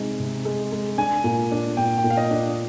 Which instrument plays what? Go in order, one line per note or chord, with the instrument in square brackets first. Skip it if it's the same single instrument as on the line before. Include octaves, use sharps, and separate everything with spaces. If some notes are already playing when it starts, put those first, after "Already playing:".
Already playing: [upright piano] C3 G#3 D#4
C3
G#3
G#3
[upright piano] D4 [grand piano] G#5
[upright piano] A#2
D4
[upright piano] A#2 [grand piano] G5
[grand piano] G5
[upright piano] A#2
[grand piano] F5
D#5
[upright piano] D4